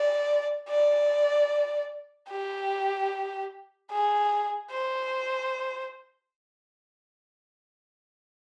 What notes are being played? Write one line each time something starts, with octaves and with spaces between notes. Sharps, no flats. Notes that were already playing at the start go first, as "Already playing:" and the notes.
Already playing: D5
D5
G4
G#4
C5